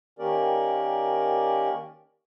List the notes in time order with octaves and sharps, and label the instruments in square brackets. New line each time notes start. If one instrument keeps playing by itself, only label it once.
[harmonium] D#3 A#3 C#4 G4 A#4 D5